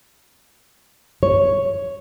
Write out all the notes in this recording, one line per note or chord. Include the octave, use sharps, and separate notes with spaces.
C#5